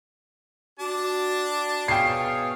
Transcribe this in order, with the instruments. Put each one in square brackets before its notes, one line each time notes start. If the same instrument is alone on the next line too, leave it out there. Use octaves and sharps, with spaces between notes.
[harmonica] D4 A5 [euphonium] F#4
[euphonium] B2 [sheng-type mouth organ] G#4 C#5 F5 [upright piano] G5 C7